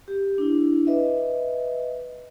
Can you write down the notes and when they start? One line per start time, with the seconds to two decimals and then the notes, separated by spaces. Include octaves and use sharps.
0.08 G4
0.38 D4 E4
0.87 B4 D#5 E5